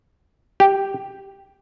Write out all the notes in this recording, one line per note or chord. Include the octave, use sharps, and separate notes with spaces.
G4